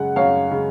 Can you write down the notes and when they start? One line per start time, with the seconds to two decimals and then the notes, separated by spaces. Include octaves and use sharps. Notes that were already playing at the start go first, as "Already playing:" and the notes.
Already playing: F#2 C#3 G#3 F#5
0.16 F#2 C#5 F5
0.50 C#3 G#3